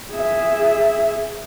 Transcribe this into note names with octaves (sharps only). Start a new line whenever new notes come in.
G#4 E5